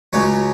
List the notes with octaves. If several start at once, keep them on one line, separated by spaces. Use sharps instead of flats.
C#2 C#3 F#3 C#5